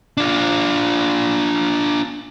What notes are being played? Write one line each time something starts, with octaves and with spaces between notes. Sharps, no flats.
D4 F4